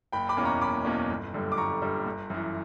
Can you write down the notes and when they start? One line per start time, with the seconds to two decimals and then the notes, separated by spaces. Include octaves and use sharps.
0.12 F#1 G5 B5
0.29 B5 D6
0.37 E2 B2 A#3 C#4
0.45 A#5 C#6
0.61 F#1 B5 D6
0.85 E2 B2 A#3 C#4
1.10 G1
1.34 F#2 D3 G3
1.52 D6
1.57 G1 A#5 C#6
1.82 F#2 D3 G3
2.05 G1
2.30 F#2 E3